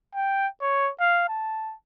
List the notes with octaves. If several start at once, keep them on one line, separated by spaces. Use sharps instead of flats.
G5
C#5
F5
A5